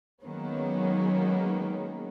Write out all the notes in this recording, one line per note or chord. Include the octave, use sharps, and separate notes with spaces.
D#3 F#3 G#3 A#3 B3 C#4